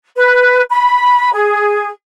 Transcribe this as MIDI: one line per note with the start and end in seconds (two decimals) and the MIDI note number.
0.15 0.62 71
0.68 1.29 83
1.33 1.88 68